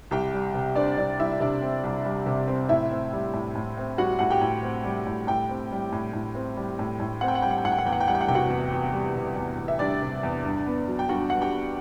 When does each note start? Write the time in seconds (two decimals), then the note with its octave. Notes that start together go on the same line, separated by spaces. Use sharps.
0.11 C2 G4 G5
0.33 G3
0.54 C3
0.75 C4 D4 D5
0.97 C2 D4 D5
1.19 G3 E4 E5
1.40 C3 D4 D5
1.62 C4
1.83 C2
2.05 G3
2.26 C3
2.48 C4
2.69 A2 E4 E5
2.91 C4
3.13 G3
3.34 A2
3.55 A2
3.77 C4
3.98 G3 F#4 F#5
4.19 A2 F#5
4.30 G4 G5
4.42 A2
4.63 C4
4.84 G3
5.07 A2
5.27 A2 G4 G5
5.49 C4
5.72 G3
5.93 A2
6.13 A2
6.35 C4
6.57 G3
6.79 A2
7.00 A2
7.21 C4 F#5
7.28 G5
7.35 F#5
7.42 G3 G5
7.51 F#5
7.58 G5
7.65 A2 F#5
7.72 G5
7.79 F#5
7.86 E2 G5
7.93 F#5
8.00 G5
8.08 G3 F#5
8.15 G5
8.21 F#5
8.28 C3 G5
8.35 F#4 F#5
8.50 E2
8.73 E2
8.93 G3
9.15 C3
9.36 E2
9.58 E2
9.68 E5
9.79 G3 D4 D5
10.02 C3
10.23 E2
10.44 G2
10.66 B3
10.88 F#3
10.99 G5
11.09 G2 F#4 F#5
11.30 G2 F#5
11.41 G4 G5
11.51 B3